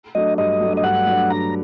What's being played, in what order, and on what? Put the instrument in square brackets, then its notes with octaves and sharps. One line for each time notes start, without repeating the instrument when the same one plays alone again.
[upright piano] F#3 A3 D4 [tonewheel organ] D#5
[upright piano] G2 [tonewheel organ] D#5
[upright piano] F#3 A3 D4
[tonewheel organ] D#5
[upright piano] G2 [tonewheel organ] F#5
[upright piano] F#3 A3 D4
[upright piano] G2 [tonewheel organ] A#5